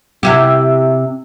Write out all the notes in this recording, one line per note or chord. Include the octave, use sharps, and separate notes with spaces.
C3 E4 G4